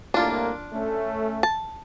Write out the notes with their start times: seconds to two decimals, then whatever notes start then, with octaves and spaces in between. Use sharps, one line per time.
0.14 C2 A2 A#3 D4 F4
0.73 A3 C#4
1.43 A5